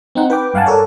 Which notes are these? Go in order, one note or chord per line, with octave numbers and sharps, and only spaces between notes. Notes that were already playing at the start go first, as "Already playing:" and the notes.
C4 D#4 F#5
B4 G5 D6
G2 F5 F#5 G#5 A5
A4 A#4 C#5 D5